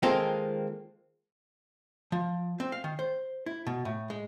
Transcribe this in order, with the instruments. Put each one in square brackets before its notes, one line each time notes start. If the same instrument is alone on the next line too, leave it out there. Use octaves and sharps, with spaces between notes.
[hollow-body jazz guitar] D#3 G#3 A#3 C4 F4 A4
F3
C4
F5
D#3
C5
E4
B2
A2
G#3